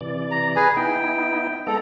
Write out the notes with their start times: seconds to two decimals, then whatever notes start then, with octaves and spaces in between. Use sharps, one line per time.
0.01 C3 E3 D5
0.31 A#5
0.56 G#4 B4 G#5
0.76 B3 D#4 E4 G5
1.67 G#3 B3 A4 A#5